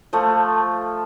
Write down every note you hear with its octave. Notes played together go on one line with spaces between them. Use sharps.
F3 A3